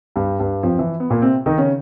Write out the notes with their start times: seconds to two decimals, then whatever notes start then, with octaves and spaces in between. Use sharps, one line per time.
0.16 G2 G3
0.40 G2 G3
0.63 F2 F3
0.79 E3
1.00 B3
1.10 A#2 A#3
1.22 C3 C4
1.46 D#3 D#4
1.58 C#3 C#4